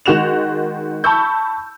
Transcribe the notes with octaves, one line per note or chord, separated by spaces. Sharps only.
D#3 G#3 F#4 F#6 E7 F7
A5 B5 C#6 E6 G6